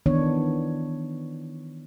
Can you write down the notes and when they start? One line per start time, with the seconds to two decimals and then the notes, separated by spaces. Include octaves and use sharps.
0.06 D#3 E3 B3 D4 C#5